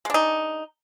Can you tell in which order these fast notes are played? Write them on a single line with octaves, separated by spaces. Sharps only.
G#3 D4 D#4